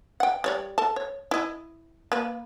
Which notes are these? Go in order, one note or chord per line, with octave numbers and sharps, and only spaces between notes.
F#5 G5
G3 C#5 D5
A4 A5
C#5
E4 D#5
A#3 B4